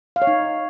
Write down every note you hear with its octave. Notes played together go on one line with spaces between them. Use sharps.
F5
C#5
D#4